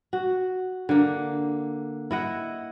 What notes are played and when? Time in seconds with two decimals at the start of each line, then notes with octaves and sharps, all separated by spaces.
0.13 F#4
0.89 D3 A#3
2.11 E4 D#5 F#5